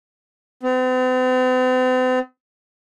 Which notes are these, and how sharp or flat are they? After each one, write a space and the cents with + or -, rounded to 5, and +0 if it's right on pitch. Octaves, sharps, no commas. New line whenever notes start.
C4 -45